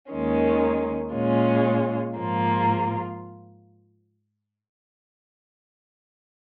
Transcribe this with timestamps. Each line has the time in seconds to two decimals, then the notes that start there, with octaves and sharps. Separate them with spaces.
0.11 D#2 D#3 G#3 C#4
1.13 A#2 G#3 C#4 F4
2.16 G#2 F3 A#3 F4